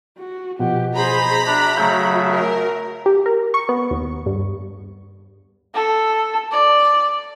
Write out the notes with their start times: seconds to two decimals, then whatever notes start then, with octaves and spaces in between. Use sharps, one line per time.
0.18 F#4
0.59 B2 F3 G4 F#5
0.95 G#4 C5 A#5 B5
1.47 D4 F#4 E5
1.77 C#3 F#3 A3 G6
2.32 A#4
3.06 G4
3.26 A#4
3.54 C#6
3.69 B3
3.91 D#2
4.26 G2
5.75 A4
6.52 D5